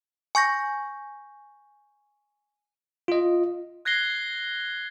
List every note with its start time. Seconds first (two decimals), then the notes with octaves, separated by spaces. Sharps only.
0.35 G#5 C#6 G6 A#6
3.08 F4 D#5
3.85 F#6 G#6 A#6 C7 G7